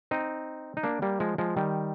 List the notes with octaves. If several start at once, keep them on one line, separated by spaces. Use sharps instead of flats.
C4 D#4
D#4
A#3 D4
G3 A#3
F3 G#3
F3 G#3
D#3 G3